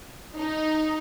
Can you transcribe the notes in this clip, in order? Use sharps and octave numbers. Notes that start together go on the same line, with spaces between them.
D#4